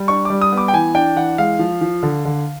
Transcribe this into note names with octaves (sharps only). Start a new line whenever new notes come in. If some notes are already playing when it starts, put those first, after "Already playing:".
Already playing: G3
D4 C#6
G3 D6
D#6
B3
D6
G5
E3 G#5
D4 G5
E3 F#5
G#3 F5
F3
F3
D3
D3